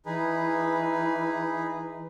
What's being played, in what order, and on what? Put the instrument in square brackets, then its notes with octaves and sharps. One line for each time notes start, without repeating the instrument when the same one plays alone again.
[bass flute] E3 [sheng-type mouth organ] D#4 G#4 B4